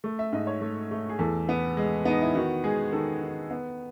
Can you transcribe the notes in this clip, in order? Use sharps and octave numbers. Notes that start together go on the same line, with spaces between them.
A3
E5
G#2 D#5
C#5
A3
A3
G#4
E2 A4
B3
G#3
B3 D#4
E4
D#3 F#4
G#3 G#4
D#3 A4
D#3
B3